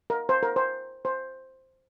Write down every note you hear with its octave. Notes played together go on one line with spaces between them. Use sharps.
A#4
C5
A#4
C5
C5